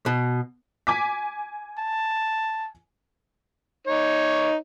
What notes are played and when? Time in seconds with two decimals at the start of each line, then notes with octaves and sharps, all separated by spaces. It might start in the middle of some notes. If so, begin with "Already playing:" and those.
0.06 B2
0.87 G#5 D6 B6
1.78 A5
3.87 D#4 C#5